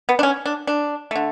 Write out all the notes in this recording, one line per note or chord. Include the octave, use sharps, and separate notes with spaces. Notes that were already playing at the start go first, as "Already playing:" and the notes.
B3
D4
C#4
D4
D4
D3 A3